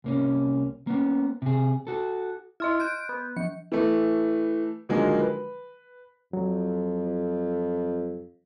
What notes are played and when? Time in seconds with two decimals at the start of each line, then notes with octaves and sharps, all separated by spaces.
0.04 C2 A#3 C#4
0.87 A#3 B3 C#4
1.42 C3 G#4
1.87 F#4 A4
2.60 E4 D#5 C6 F6
2.80 F#6 G6 D7
3.09 B3
3.36 F3 C#7
3.72 E3 A3
4.89 D3 D#3 F3 F#3 G#3 A#3
5.20 B4
6.33 F2 F#3